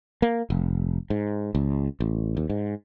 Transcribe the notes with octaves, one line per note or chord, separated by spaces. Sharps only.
A#3
F1
G#2
C#2
A1
D#2
G#2